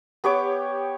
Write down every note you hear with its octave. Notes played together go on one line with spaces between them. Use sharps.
B3 G4 C#5 D6